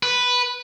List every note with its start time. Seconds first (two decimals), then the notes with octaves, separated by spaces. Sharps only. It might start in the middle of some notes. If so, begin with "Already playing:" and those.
0.03 B4